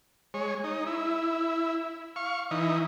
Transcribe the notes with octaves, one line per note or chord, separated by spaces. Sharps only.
G#3 C#5
D#4
E4
F5 C#6
E3 D#4